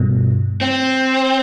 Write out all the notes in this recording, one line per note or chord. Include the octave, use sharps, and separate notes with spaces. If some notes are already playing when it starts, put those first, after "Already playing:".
Already playing: G2 B2
C4